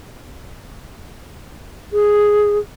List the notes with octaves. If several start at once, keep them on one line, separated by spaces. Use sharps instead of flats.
G#4